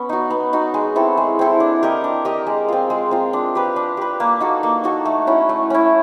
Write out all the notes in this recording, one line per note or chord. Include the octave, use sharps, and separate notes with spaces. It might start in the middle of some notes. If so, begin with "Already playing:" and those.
Already playing: B3 C#4
D#4 F#4
B3
D#4 F#4
G#3
C4 E4 A4
G#3
C4 E4 A4
D4
G4 A#4 D#5
D4
G4 A#4 D#5
G#3
C4 F4
G#3
C4 F4
D4
G4 B4
D4
G4 B4
A#3
D#4 F#4 A4
A#3
D#4 F#4 A4
A3
C#4 E4
A3
C#4 E4